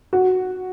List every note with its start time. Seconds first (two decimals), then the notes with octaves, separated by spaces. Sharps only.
0.13 F#4